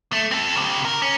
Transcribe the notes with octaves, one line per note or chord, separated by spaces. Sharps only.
A3
C4 A4
C#3 G4
A#4
C#4